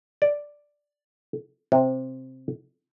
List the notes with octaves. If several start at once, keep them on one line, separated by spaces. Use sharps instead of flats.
D5
C3